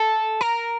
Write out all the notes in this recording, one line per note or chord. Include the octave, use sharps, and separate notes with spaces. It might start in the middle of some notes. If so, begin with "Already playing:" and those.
Already playing: A4
A#4